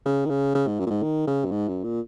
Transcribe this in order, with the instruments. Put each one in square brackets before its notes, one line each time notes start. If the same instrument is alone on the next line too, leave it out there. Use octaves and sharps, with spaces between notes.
[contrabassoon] C#3
D#3
C#3
C#3
G#2
F#2
A#2
G#2
D#3
C#3
F#2
G#2
F#2
A#2